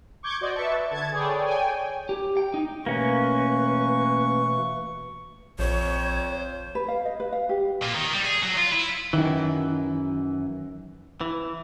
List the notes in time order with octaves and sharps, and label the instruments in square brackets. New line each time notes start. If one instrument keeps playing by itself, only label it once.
[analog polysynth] C#6 D6 G6 G#6
F#4 C5 D5 D#5
B4 E5 A5 C#6
D3 A5 G#6
G#4 A4 B4 C#5 D5 G5
C#5 G5 G#5
[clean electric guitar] G4
G5
D#4
[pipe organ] B2 E3 A3 [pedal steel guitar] A#3 C#4 [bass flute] B4 [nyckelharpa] C#6
[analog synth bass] A#1 [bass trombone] F2 [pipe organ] C5 [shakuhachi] C#5
[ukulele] B4
F5
D#5
B4
F5
G4
[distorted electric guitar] A#2
D#3
G3
G#4
F#3
F4
E4
[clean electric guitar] F#2 E3 [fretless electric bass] D#3
[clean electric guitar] E3